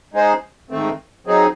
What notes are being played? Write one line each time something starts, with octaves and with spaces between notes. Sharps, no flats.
G#3 D#4 G#4 C5
G#2 D#3 A3 C4
F#3 C4 D#4 G#4